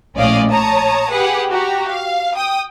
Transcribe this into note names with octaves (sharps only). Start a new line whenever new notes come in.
A#1 A2 C#4 D5 D#5 F5
C#5 A5 A#5 D#6
G4 G#4 B4 F#5
F#4 G4 A#5
F5
G5 D#6